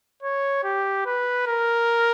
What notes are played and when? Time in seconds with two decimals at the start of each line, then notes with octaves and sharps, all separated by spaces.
0.23 C#5
0.64 G4
1.06 B4
1.47 A#4